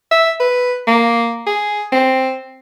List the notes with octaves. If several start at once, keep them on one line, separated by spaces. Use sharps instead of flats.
E5
B4
A#3
G#4
C4